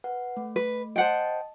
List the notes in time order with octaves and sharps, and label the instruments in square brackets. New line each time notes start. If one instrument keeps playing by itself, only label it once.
[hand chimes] B4 F#5
A3
[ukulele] B4
[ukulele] C5 F#5 G5 [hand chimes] D#5 A5